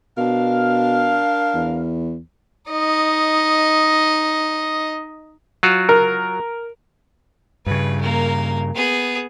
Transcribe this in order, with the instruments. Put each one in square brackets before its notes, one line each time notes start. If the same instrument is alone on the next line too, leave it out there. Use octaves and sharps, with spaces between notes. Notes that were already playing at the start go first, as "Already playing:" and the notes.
[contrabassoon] B2 [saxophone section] D4 A#4 F5
[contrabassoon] E2
[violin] D#4 D#5
[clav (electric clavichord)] F#3 F4 F#4
[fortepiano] A#4
[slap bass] G2 C#3 [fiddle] B4
[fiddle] A#3 A#4
B3 G#4